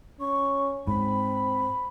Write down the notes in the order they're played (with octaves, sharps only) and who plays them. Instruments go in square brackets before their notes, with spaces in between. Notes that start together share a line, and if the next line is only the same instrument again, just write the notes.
[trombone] C#4 [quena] C#6
[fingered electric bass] G#2 [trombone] C4 [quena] B5